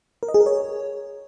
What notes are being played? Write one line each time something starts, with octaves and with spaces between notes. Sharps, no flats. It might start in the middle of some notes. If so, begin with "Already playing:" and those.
A#4
D#5
G#4
A#4
C#5